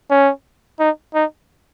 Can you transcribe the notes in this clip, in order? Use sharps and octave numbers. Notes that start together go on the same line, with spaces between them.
C#4
D#4
D#4